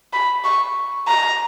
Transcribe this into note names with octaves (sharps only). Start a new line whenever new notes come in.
B5
C#6
A#5